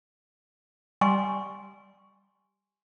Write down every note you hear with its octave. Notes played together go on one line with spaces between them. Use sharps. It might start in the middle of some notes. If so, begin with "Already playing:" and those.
G3 G#5 C6 C#6